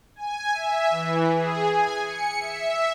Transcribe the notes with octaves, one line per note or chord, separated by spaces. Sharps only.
G#5
E5
E3
G#4
G#5
C#7
E5